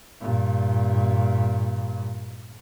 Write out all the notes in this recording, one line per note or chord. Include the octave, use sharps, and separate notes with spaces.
G2 A#2